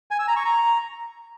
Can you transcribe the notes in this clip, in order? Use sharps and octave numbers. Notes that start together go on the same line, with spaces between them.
G#5
E6
A#5
C#6
A#5